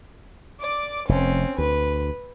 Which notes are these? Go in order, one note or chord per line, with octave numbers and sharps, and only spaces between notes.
D5 D6
F1 C4 C#4
D2 B4